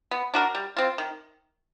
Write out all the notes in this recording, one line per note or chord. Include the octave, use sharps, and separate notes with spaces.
B3
D4 F#4 A#4
G3
C4 F4
D#3